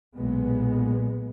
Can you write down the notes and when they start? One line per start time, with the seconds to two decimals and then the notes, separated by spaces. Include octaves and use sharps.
0.15 B1 A#2 G#3 B3